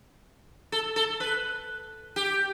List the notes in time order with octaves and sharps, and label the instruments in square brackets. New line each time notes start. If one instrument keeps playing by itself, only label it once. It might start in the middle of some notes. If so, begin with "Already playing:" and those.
[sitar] A4
A4
B4
G4